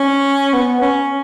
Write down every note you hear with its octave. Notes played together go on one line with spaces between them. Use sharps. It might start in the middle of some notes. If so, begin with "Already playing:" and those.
Already playing: C#4
B3
C#4